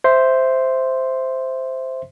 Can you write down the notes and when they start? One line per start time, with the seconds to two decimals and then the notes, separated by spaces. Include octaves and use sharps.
0.04 C5 E5 C6